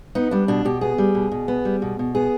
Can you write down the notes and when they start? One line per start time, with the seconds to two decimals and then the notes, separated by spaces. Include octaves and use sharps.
0.15 B3 D#4
0.31 G3 D4
0.48 B2 D4
0.65 B2 G4
0.81 B3 G#4
0.98 G3
1.15 B2
1.31 B2
1.48 B3
1.65 G3
1.82 B2
1.99 B2
2.15 B3 G#4